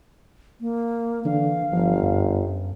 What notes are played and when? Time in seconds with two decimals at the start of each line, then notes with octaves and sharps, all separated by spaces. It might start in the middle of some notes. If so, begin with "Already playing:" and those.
0.61 A#3
1.25 D3 E3 F5
1.72 G1 F3
2.03 F#2